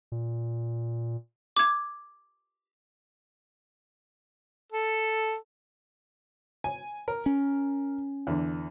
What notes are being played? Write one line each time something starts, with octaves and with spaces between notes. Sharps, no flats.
A#2
D6 G#6
A4
G#5
A#4
C#4
E2 D3